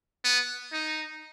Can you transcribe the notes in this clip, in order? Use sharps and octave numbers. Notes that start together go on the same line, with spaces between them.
B3
D#4